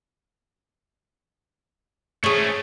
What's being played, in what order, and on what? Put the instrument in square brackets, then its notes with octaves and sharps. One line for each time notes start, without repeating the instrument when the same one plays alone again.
[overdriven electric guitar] A3 C#4 [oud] G#4 C#5